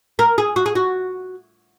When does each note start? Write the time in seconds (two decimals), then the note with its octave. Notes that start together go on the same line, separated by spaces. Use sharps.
0.19 A#4
0.38 G#4
0.56 F#4
0.66 G#4
0.75 F#4